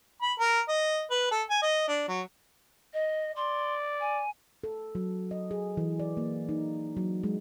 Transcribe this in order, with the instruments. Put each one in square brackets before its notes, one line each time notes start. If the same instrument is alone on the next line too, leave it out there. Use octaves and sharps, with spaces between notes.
[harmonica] B5
A#4
D#5
B4
A4
G#5
D#5
D4
F#3
[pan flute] D#5
[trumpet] D5 [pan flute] C6
[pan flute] G#5
[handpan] A4
F#3
D#5
G#4
E3
D5
A#3
D#4
F#3
G#3